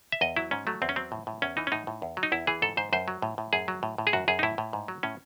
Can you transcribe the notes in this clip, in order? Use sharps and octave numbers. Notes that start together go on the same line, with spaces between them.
E5
E2 D#5
F#3 E4
G#2 C#4
F#3 A3
E2 C4
C#4
F#3 C4
A2
A2
E2 C#4
E3 D#4
C#4
A2 D#4
A2
E2
F#3
D#4
E2 E4
E3 G#4
G#2 A4
G#2 C5
F#2 C5
F#3
A2
A2
F#2 G#4
F#3
A2
A2
G#4
F#2 F#4
F#2 G#4
D#4
A2 E4
A2
G#2
F#3
A2 C#4